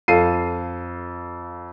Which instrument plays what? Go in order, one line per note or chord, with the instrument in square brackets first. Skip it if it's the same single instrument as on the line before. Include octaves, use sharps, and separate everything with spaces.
[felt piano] F2 A4 F5 C7 D#7